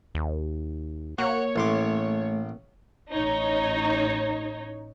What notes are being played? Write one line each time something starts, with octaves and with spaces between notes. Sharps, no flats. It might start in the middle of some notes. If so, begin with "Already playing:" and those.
D#2
A#3 F#4 C#5
A1 A3 C6 D6
A1 D#4 C#5